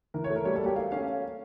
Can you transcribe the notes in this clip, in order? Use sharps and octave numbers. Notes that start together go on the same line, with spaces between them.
E3 A#4
C#5
A3
A#4
G3 C#5
A4
A#3 G4
A3 F5
C#4 F5